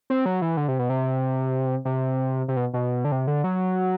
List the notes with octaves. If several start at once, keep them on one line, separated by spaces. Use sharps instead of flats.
C4
F#3
E3
D3
C3
B2
C3
C3
C3
B2
B2
D3
C3
D3
F#3